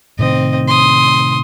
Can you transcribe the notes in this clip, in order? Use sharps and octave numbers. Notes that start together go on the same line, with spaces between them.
A2 C3 D#3 C4 D#5
C6 D#6